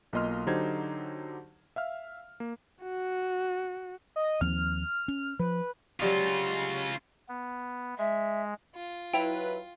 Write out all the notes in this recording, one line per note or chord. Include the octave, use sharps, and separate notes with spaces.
B1 A#3 F4 D#5 C6 F6
D3 F#3 D#4 G4 C5 G#6
E5 F5 F6
A#3
F#4
D#5
D#2 F3 C4 F6
C#4
F3 B4
C#3 F#3 G3 F4 C6
B3
G#3 E5
F4
F#3 E4 B4 G5 F7